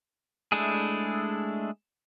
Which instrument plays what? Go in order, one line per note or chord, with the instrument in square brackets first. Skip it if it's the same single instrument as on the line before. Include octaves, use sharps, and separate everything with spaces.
[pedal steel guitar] G#3 A3 D4 E4 G#4